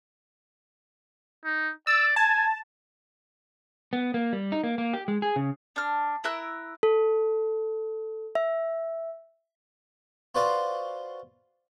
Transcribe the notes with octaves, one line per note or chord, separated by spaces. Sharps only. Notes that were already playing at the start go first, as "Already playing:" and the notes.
D#4
D5 E6
G#5 A5
B3
A#3
G3
D#4
A#3
A#3
G4
G#3
G#4
C#3
D4 F6
E4 A#4 E6 F#6
A4
E5
F4 F#4 B4 C5 D5 F5